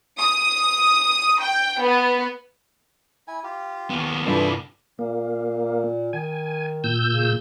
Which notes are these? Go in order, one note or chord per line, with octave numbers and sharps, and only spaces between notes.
D#6
G5
B3
E4 G#5
F4 G4
D#2 B3
G2 C3 E3 E4 F4 A4 D5 A5
A#2 A#3
D#3 G#5
A#2 E6 G6
C#3